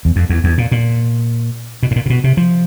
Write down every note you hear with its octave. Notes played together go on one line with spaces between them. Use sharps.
E2
F2
E2
E2
A#2
A#2
B2
A2
A#2
C3
B2
C3
F3